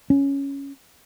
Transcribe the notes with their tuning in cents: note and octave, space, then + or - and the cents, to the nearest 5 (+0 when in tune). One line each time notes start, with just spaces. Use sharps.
C#4 +5